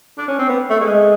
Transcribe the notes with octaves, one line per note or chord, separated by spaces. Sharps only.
D4
C#4
C4
B3
A3
G#3